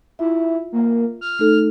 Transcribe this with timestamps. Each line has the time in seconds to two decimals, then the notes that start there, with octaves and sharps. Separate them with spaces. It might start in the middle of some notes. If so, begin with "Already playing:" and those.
0.19 E4 F4 E5
0.72 A#3
1.21 F6
1.39 A3 D#4 A4